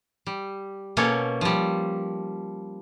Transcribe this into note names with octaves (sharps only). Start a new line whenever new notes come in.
G3
B2 A#3 C#4 A4 C#5
F3 G3